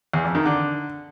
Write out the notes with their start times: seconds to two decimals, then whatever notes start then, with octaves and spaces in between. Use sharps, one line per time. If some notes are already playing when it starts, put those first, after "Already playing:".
0.13 E2
0.24 F2
0.35 D#3
0.45 D3